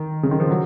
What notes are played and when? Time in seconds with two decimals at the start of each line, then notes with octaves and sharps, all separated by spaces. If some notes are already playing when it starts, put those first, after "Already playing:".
Already playing: D#3
0.23 C#3
0.31 D#3
0.40 F3
0.49 F#3